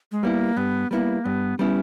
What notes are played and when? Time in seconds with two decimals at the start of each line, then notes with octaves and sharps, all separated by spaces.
0.12 G#3
0.23 G3 A#3 B3 E4
0.57 G2 B3
0.91 G3 A#3 B3 E4
1.24 G2 B3
1.59 G3 B3 C#4 E4